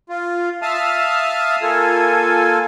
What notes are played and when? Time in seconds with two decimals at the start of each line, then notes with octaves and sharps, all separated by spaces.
0.10 F4
0.62 E5 F5 A5 D#6 F6
1.62 A#3 F4 A4 G#5